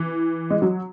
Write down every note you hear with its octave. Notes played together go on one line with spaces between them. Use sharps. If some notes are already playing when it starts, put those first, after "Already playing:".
Already playing: E3
G#3
F#3